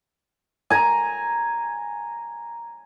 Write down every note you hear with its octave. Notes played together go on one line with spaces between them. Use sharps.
G#5 A#5